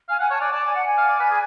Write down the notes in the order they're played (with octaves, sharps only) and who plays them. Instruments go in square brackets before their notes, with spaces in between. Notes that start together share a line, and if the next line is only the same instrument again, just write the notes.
[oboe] F5 [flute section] G#5
[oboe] F#5 [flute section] G#5
[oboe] C#5 [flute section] A5
[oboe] D5 [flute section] G#5
[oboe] D5 [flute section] A5
[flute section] G#5
F#5
G#5
[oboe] F5
D5
B4
G#4